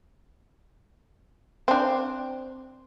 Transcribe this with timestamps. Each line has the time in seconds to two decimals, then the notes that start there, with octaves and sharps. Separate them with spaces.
1.68 C4 D4